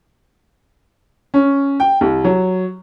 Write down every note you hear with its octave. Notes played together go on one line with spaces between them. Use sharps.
C#4
G5
C2
F#3